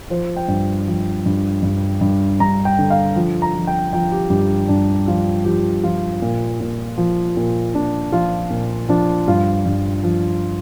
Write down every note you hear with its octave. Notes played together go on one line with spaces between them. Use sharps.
F3 C5
G5
G2
F3
G2
G2
G2
G2 A#5
G5
D3
F5
F3
A#5
F3
G5
F3 G5
G4
G2 G4
G2 D4
F3 F4
F3 G4
F3 F4
A#2
A#2
F3
A#2
A#2 D4
F3 F4
A#2
F3 D4
G2 F4
G2
F3